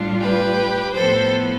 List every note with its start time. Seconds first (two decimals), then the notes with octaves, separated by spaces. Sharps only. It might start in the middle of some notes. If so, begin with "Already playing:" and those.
Already playing: A2 G3 D4 F4
0.20 G4 B4
0.94 A2 F3 B3 A4 C5